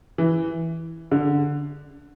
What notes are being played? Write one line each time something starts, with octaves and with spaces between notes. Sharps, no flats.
E3
D3